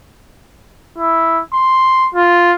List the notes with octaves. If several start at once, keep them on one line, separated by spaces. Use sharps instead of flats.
E4
C6
F4